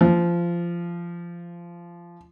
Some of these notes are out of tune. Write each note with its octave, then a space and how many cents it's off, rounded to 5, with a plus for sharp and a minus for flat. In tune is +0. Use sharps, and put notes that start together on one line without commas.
F3 -20